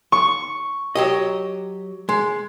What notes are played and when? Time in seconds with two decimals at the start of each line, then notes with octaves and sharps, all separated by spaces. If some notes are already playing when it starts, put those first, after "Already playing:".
0.12 C#6
0.95 F#3 G4 D#5
2.09 G#3